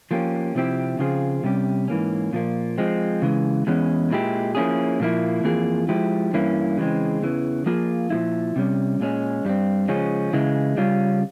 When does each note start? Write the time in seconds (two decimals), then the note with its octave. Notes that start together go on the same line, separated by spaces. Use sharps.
0.11 F3 A#3 C#4 G4
0.55 C3 F3 C4 E4 G4
0.99 C#3 F3 C4 F4 G#4
1.44 C3 G3 C#4 G4
1.88 G#2 E3 A#3 C#4
2.33 A#2 F3 A#3
2.78 F3 G#3 C4
3.22 C#3 E3 G#3
3.67 E2 E3 G#3 C#4
4.11 A#2 G#3 E4 G4
4.55 F3 A#3 C#4 E4 G#4
5.00 A#2 F3 A#3 E4
5.44 F2 E3 A#3 F4 G#4
5.89 F3 G#3 E4 G4
6.33 G2 E3 A#3 C#4 E4
6.77 C#3 E3 G#3 C4
7.22 E2 C#3 E3
7.66 F3 A#3 F4 G#4
8.10 A#2 F3 G#3 E4
8.56 C3 G3 C#4
9.01 A#2 G#3 C#4
9.45 G2 G3 C4
9.88 C#3 F3 G#3 C#4
10.33 C#3 E3 G#3 E4
10.77 C#3 G3 C#4 F4